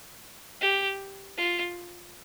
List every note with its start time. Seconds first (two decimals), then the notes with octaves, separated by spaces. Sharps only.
0.61 G4
1.37 F4